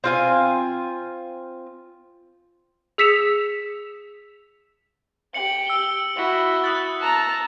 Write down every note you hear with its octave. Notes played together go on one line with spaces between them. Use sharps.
C4 F4 G#5
G#4 E6 B6 C#7 E7 F7
G4 C#7 F#7
E6 F#7 G7
E4 F#4
D#6 F#6 A6
A5 A#5